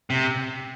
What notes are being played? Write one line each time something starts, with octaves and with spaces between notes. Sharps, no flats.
C3